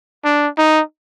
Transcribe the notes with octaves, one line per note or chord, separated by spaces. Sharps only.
D4
D#4